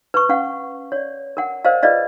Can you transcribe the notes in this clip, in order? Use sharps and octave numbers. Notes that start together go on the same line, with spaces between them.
B4 C#6
C#4 F5 F#5
C#5 D5
A#4 F#5
A#4 C5 D5 D#5 F5
F4 G#4 B4 D5 D#5 F5